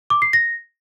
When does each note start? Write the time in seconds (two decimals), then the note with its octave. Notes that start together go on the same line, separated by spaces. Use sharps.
0.10 D6
0.22 C7
0.33 A#6